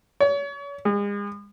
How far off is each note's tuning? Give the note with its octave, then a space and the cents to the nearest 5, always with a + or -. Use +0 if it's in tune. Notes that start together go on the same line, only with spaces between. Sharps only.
C#5 +35
G#3 -40